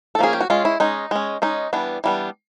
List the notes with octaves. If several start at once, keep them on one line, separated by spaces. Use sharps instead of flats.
A4
F3 A#3 C#4 G#4
G4
F#4
G#3 C#4 F4
E4
G#3 C#4 D#4
G#3 C#4
G#3 C#4 D#4
E3 G3 B3 D4
E3 G3 B3 D4